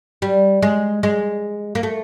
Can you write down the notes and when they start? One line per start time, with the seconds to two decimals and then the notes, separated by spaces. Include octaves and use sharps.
0.22 G3
0.62 G#3
1.03 G#3
1.75 A#3
1.83 A3